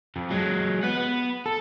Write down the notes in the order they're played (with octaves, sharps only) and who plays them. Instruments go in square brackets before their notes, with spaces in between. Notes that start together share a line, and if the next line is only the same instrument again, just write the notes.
[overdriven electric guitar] F2
F#3 G#3
B4 F#5
B3
A4